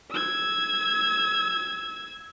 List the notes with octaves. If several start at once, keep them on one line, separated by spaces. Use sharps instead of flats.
E6 G#6